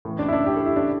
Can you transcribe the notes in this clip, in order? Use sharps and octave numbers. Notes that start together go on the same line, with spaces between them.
A2 E3
D4
E4
D4
G4
A4
E4
D4